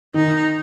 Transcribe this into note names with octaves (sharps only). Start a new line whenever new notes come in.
D#3 D#4